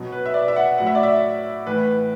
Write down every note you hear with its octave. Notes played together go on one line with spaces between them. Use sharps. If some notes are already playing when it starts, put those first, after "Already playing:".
Already playing: B2 F#3
B4
E5
D5
E5
F#5
A2 F#3 F#5
E5
D5
E5
A2 E3 B4